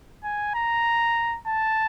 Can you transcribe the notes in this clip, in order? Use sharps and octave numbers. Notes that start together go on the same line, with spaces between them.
G#5
A#5
A5